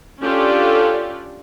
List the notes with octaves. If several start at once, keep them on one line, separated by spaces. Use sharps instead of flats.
C#4 D4 F4 G4 A4 D5